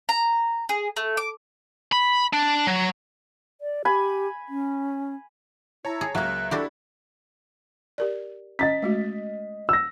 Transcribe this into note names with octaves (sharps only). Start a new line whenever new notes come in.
A#5
G#4
A3
D6
B5
D4
F#3
D5
G4 G#5 B5
C#4
E4 C#5 A5 A#5
G#4
C#2 F#3 A#3 E5 A#5 F#6
D4 E4 F#4 G4 A4 B5
G4 A#4 D5
C#4 D#5 A#5 A6 B6
G#3 A3 F#4
E6 A#6